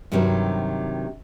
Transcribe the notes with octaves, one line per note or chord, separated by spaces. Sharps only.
G2 C3 D#3 F#3 G3 C4